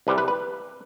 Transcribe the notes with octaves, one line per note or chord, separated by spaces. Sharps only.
C2 C3 G3 B4
B4
B4